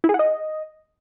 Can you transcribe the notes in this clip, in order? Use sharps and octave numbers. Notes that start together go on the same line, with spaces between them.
E4
G#4
F#5
D#5